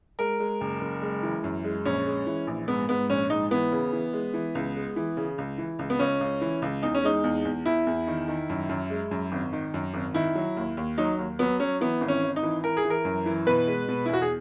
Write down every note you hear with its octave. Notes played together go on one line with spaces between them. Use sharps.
G#3 A#4
G#3
F#1
F#1
G#3
E3
F#2
G#3
A#1 C#4
G#3
E3
A#1
G#2 B3
G#2 B3
A#1 C#4
G#2 D#4
E3 B3
C#3
E3
G#3
E3
C#2
G#3
E3
C#3
C#2
E3
C#2
B3
C#2 C#4
C#2
E3
C#2
E2 D#4
C#4
G#3 D#4
E2
E2
E2 E4
E2
D#3
D#3
F#2
F#2
G#3
F#2
G#1
D#3
F#2
G#1
D#3 E4
F#3
D#2
D#2
F#3 D#4
D#2
F#3 B3
F#3 C#4
E3 B3
G#1
C#4
G#1
D#4
E3
E3 A#4
G#4
E3
A#4
F#2
E3
B2 B4
G#3
B2
E4
E2 F#4
G#4